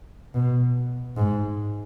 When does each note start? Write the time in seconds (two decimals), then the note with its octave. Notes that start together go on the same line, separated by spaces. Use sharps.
0.34 B2
1.16 G#2